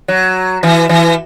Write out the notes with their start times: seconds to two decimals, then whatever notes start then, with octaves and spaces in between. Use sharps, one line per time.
0.08 F#3
0.63 E3
0.89 E3